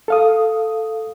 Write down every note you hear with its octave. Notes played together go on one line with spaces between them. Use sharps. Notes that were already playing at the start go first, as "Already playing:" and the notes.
A4 F5 D#6